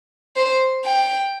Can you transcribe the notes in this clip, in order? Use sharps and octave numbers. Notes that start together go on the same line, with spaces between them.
C5
G5